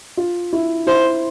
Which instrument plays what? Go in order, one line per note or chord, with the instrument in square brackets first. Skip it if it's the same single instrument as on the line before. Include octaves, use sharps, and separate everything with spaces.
[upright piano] F4
E4
[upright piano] E4 [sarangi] C5